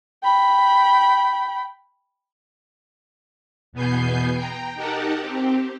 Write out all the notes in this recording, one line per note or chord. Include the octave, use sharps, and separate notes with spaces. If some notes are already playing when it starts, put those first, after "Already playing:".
G5 B5
E2 B2 B3 G#5 G6 C7
G5 A#5
D#4 G4 A#4 F#5 A5
C4 G4